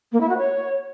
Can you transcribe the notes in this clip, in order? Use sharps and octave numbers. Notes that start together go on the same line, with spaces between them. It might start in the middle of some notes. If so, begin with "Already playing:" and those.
A#3
E4
F#4
C#5